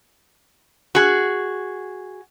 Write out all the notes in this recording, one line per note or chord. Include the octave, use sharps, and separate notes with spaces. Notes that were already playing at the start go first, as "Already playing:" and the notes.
F#4 G#4